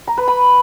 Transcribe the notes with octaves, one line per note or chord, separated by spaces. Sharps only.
A#5
B4
B5